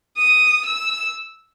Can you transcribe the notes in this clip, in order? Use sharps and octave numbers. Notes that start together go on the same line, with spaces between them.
D#6
E6